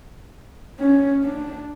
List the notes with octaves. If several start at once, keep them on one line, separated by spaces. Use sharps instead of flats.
C#4
D4